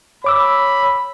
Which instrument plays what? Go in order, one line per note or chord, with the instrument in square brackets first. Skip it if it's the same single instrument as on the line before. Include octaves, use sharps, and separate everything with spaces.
[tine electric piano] C#5 D6 E6 [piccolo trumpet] B5